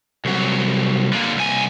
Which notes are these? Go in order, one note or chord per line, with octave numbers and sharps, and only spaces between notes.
C2 F#3
D3 A#3
C2 G#5